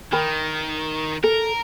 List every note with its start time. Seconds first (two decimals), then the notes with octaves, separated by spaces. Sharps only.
0.12 D#3 A#4 G5 B5
1.24 A4 A#4